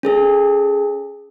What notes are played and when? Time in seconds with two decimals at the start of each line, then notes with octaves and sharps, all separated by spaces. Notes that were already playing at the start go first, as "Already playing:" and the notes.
0.03 C#4 G#4 A4